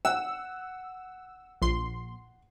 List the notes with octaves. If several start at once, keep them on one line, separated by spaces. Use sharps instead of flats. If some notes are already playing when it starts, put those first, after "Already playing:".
F#5 E6
A#1 C6